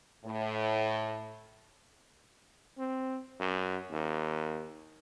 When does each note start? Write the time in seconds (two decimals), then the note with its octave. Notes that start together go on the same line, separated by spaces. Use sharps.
0.25 A2
2.78 C4
3.40 F#2
3.92 D#2